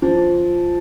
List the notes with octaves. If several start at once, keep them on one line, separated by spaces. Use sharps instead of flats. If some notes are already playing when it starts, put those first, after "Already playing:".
F3